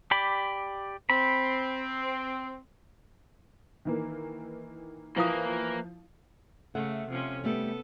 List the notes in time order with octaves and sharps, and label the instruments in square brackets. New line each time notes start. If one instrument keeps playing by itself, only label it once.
[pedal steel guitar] G4 D5 B5
[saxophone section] C4 [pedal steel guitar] B5
[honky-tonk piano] D#3 E3 A#3
[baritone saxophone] E3 [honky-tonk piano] F3 [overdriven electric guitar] A#3 A#4 [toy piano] E4 F5 D#6
[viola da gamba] C#3 A3 [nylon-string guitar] A4 E5 F#5
[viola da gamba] C3 F3 C#4
[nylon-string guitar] G3 A3 G4 [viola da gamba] B3 A4